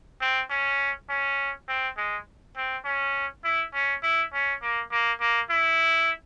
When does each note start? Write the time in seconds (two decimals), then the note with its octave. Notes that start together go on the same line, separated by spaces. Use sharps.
0.21 C4
0.50 C#4
1.10 C#4
1.68 C4
1.97 G#3
2.57 C4
2.85 C#4
3.44 E4
3.74 C#4
4.03 E4
4.33 C#4
4.62 A#3
4.92 A#3
5.20 A#3
5.50 E4